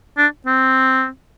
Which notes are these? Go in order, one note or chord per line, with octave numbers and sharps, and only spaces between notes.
D4
C4